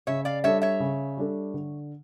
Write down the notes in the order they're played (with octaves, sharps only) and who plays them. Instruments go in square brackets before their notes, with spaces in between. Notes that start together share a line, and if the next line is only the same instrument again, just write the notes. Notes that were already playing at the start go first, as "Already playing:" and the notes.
[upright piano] C#3 [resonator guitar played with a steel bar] C#5 E5
[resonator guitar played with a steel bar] D5 F5
[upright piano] G3 D4 A4 [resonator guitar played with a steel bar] C#5 E5
[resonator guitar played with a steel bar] C#5 E5
[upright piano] C#3
G3 D4 A4
D3